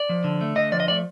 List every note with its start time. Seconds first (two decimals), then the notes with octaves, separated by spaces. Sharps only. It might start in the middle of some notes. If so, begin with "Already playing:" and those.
Already playing: D5
0.09 F3
0.24 D3
0.41 A3
0.56 D3 D#5
0.72 F3 D5
0.80 D#5
0.88 A3 D5